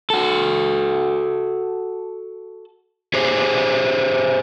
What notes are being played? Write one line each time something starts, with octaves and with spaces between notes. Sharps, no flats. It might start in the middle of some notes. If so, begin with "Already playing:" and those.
F#4 A4
G4 G#4 C5 C#5